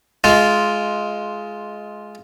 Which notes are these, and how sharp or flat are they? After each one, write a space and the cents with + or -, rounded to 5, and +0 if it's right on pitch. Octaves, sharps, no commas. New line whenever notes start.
G#3 +20 F4 +0